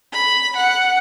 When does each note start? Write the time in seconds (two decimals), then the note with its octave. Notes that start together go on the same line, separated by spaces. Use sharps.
0.13 B5
0.56 F#5